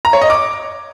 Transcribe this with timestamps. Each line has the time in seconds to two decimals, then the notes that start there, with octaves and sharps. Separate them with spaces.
0.05 A#5
0.13 C#5
0.21 D#5
0.30 D6